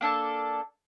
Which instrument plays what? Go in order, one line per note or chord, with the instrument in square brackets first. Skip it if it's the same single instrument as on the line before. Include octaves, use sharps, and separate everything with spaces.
[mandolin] A#3 D4 A4 A5